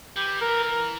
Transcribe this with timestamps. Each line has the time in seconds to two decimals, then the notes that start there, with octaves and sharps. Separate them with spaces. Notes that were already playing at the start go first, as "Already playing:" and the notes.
0.17 E3 G4
0.41 A#4
0.64 A#4